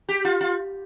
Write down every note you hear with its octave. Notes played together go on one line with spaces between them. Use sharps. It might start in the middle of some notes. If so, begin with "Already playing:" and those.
G4
F4
F4